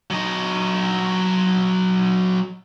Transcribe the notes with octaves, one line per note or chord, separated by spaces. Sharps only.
F#3 D#5